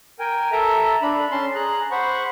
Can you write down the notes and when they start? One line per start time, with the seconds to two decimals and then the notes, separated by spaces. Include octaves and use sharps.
0.19 A#4 G5 G#5
0.52 A4 E5 A#5
1.02 D4 B5
1.31 C#4 A5 C6
1.55 G#4 A#5 F#6
1.91 C5 F#5 B5 C#6